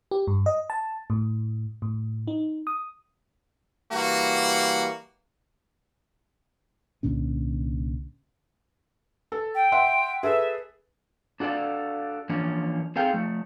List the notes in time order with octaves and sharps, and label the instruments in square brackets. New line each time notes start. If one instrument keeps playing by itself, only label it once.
[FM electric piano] G4
G2
D#5
A5
A2
A2
D#4
D#6
[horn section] E3 G3 A#3 F#4
[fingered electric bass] C2 A#2 D3 C#4
[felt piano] A4
[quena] G5
[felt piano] E5 F#5 C6
[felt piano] G#4 A4 B4 [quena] E5
[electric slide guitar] D4 F#4 A4 D5 F5
E3 F3 A#3 C#4 D4
C4 D#4 G#4 A4 F5 G5
F3 A3